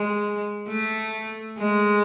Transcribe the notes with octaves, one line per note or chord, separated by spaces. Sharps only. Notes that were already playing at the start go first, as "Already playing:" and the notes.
Already playing: G#3
A3
G#3